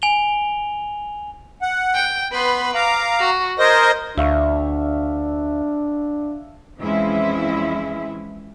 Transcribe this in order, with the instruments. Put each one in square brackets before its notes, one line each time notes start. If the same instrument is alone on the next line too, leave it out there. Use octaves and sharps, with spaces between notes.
[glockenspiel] G#5 F7 G7
[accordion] F#5
[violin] G5
[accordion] B3 B5 [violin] B4 C6
[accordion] F5 A#5 [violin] D6
[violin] F#4
[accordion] A#4 C5 D#5 [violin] G#6 A#6
[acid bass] D2 [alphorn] D4 [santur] E5 F5 C#6
[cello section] F2 E3 G#3 C#4 E4 E5